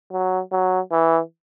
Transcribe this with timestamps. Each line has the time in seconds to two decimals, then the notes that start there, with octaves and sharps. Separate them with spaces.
0.12 F#3
0.52 F#3
0.92 E3